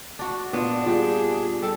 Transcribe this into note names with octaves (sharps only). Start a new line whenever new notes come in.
D4 F#4
A#2 B3 D4 D5
G3 F4 G4 G#4
G3 A4